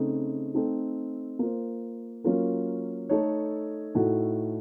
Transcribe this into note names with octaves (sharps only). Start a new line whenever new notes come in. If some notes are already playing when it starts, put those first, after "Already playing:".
Already playing: C#3 A3 C4 D#4
A3 C4 D#4 A4
A#3 F4 C5
F#3 A#3 C#4 F4 A#4
A3 D#4 A4 C#5
A2 A3 D#4 F#4